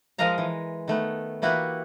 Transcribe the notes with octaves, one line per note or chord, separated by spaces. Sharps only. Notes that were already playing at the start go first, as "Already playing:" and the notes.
F3 G#3 A#4 D#5 F5 A#5
E3
D#3 A3 B3
E3 A#3 E4 F#4 G4 B4